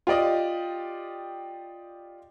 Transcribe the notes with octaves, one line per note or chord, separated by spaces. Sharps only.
F4 G4 D5 D#5